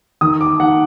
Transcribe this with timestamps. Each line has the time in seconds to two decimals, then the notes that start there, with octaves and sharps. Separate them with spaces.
0.21 D#3 D#6
0.41 D6
0.60 D#3 F#5